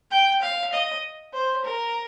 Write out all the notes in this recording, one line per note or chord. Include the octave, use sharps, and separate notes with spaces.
G5
F5
D#5
C5
A#4